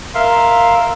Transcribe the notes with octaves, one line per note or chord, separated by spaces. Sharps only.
A#4 E5 F5 C6